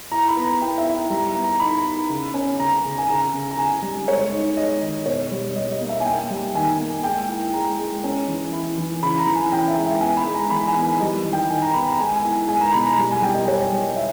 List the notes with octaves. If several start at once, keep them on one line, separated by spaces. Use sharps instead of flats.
E4 A#5
B5
B3
A#5
E4 G5
E5
E4
G3 A#5
A#5
B3
A#5
D#4 B5
D#4
C#3
C#4
C#3 A#5
C#3
G#5
C#3 A#5
C#3
A#5
C#3 G#5
G3
G#3 C#5
D#4
G#3 D#5
D#3
B2 C#5
G3
G3 D#5
D#5
A#3
E5
G#5
A#3 G5
G3
D#3 G#5
A#3
G#3 G5
E4
G#3 A#5
G#3
C#4
E3
E4
E3
C#3 B5
A#5
E3
G#5
C#4 G5
E5
G#3
E5
B3 G#5
B5
G#3
A#5
E3 B5
G#5
B3
G#5
G3 D#5
D#3
G5
D#3 G#5
A#5
B3 B5
A#5
G#3 G#5
G#5
E4
G#5
G#3 G#5
A#5
B2 B5
A#5
G3 G#5
G#5
G3 G5
D#5
G3 C#5
G3
E5